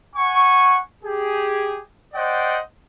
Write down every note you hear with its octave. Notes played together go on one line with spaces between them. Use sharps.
F#5 G#5 C#6
G4 G#4
C5 D5 D#5 F#5 G5